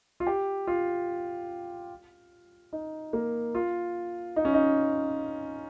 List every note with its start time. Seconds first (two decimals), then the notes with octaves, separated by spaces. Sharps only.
0.20 F4
0.27 G4
0.67 F4
2.73 D#4
3.13 A#3
3.55 F4
4.36 D#4
4.45 C#4
4.54 D#4